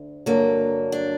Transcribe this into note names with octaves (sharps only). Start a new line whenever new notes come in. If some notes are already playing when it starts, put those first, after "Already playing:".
Already playing: D2
G2 D3 F#3 A#3
D4